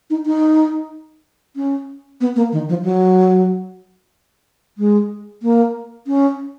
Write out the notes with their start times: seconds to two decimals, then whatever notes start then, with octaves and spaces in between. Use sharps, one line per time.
0.10 D#4
0.26 D#4
1.56 C#4
2.21 B3
2.36 A#3
2.52 D#3
2.69 F3
2.84 F#3
4.78 G#3
5.43 A#3
6.07 C#4